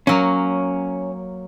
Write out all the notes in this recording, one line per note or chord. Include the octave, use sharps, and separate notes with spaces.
F#3 A#3 C#4